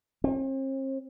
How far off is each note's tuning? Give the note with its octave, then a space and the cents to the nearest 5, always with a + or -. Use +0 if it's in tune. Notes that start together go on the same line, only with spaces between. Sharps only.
C4 +40